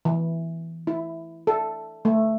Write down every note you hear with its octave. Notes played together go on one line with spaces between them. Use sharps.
E3
E4
A4
A3